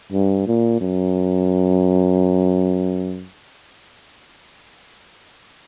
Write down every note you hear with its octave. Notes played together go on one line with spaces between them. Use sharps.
G2
A#2
F#2